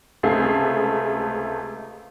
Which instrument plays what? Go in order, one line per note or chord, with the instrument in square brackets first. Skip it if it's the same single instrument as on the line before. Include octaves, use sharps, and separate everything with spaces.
[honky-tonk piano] C#2 C3 A3 G#4 C7